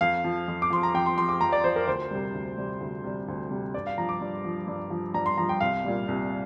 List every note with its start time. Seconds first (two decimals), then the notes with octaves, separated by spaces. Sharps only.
0.01 F2 F5
0.24 F3
0.48 F2
0.62 D6
0.70 F3 C6
0.83 A#5
0.94 F2 G5
1.06 C6
1.18 F3 C6
1.29 D6
1.41 F2 A#5
1.52 D5
1.64 F3 C5
1.76 A#4
1.87 D2 C5
2.11 C3 G3
2.34 D2
2.58 C3 G3
2.81 D2
3.04 C3 G3
3.28 D2
3.50 C3 G3
3.74 G2 D5
3.87 F5
3.98 F3 A#5
4.09 D6
4.21 G2
4.45 F3
4.68 G2
4.90 F3
5.14 G2 A#5
5.26 C6
5.38 F3 A#5
5.49 G5
5.61 C2 F5
5.84 A#2 G3
6.08 C2